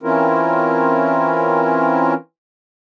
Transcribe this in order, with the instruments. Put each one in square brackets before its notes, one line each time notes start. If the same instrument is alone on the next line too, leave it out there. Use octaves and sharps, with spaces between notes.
[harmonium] E3 C4 C#4 E4 F4 A#4